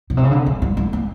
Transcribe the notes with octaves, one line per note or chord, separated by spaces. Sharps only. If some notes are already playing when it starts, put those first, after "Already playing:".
B2
C3
C#3
D3
F#3
G3
A3
A#3